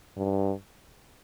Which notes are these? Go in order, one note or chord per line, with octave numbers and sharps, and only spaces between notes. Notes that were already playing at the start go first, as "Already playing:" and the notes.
G2